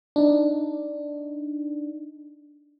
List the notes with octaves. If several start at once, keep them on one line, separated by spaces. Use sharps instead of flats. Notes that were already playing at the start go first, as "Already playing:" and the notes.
D4 D#4